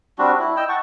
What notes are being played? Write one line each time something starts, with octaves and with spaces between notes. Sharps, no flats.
G3 C4 D4 F#4
E4
D#5 G5 E6
F#5 A5 C#6